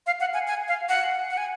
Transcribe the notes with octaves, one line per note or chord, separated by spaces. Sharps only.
F5
F#5
G#5
G#5
F5
F#5
F#5
G#5